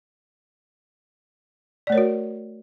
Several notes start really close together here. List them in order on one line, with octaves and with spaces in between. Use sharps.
D5 A3 C#5 A#4 F#4